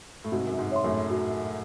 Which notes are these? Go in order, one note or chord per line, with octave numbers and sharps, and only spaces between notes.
A2
G#2 C3 F#4
F#2
G#2
C#5 E5 C6
F#2 A2
F#4